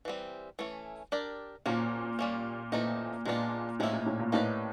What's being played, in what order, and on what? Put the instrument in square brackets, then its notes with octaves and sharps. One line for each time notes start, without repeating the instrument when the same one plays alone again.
[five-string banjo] E3 G3 C4
E3 A3 C#4 E4
D4 G4 A#4 D5
[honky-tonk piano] A#2 [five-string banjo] F3 A#3 C#4 F#4
[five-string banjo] G3 A#3 C#4
[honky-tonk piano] A#2 [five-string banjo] E3 A3 C4 D#4
[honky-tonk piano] A#2 [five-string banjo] G#3 B3 D4 F4
[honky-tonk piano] A2 [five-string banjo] F3 G#3 C#4 E4
[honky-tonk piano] A#2
A2
A#2
[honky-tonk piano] A2 [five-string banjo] A#3 D#4 G4 B4 D5